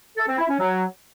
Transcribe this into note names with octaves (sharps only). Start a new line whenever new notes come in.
A4
C4
E4
C#4
F#3